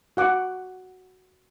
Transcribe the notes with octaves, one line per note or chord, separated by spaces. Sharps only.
F#4 F#5 D6